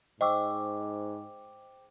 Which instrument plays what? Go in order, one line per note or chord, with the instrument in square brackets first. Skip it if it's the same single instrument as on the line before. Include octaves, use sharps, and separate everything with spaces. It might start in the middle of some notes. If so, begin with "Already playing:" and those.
[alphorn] G#2 [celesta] C5 G5 D6 [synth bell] D#5 C#6 E6